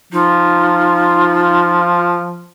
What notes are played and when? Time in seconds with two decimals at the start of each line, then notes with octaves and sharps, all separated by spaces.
0.13 F3 D#4 F4